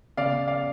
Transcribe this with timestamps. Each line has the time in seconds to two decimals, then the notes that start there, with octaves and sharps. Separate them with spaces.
0.17 C#3 D5 F5
0.48 D5 F5